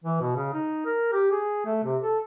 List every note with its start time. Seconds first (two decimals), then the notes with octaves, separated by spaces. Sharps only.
0.04 E3
0.21 B2
0.36 C#3
0.54 D#4
0.85 A#4
1.12 G4
1.31 G#4
1.65 A3
1.84 C3
2.01 A4